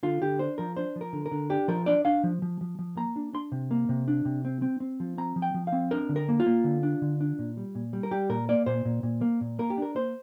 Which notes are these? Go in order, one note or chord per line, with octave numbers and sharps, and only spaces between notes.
D3 F4
D3 G4
D4 C5
F3 A#4
D4 C5
F3
A#4
D3
A#4
D3
D4 G4
F3 A#4
D4 D5
D4 F5
F3
F3
F3
F3
A#3 A#5
D4
D4 C6
C3
A#3
C3
D4
C3
C4
C4
C4
F3
C4 A#5
F3
G5
F3
F5
C4
D4 A#4
D3
A#4
A#3
F4
A#3
D3
D4
D3
D4
A#2
G3
A#2
G3
A#4
G3 G4
A#2 A#4
A#3 D5
A#2 C5
A#2
A#2
A#3
A#2
A#3 A#4
G4
D4 A#4
A#3 C5